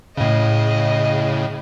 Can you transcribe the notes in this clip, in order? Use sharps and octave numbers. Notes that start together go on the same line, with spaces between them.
A2 C#3 D#5